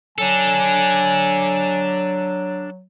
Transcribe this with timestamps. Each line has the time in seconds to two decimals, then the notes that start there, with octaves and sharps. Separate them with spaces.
0.18 F#3 D4 A4 G#5